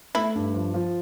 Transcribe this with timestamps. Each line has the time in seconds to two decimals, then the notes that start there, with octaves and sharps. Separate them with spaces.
0.15 A3 E4
0.35 G2
0.54 F3
0.74 F3